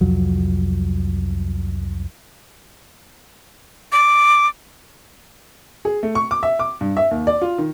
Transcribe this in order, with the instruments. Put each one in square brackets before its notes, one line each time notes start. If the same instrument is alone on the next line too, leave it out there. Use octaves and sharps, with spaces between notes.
[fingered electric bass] C2 F2 F#3
[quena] D6
[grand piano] G#4
A3
C#6
D6
E5
D6
G2
E5
D#2
D5
F4
D#3